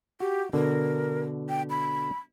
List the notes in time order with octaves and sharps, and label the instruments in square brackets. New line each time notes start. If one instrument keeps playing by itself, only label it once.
[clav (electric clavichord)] F#4 [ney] G4
[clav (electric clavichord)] B2 D3 [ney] A#4
[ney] G5
B5